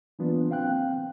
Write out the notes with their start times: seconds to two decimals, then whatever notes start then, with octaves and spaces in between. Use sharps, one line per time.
0.19 E3 F#3 A#3 B3 D4 F4
0.50 C4 F5 G5 F#6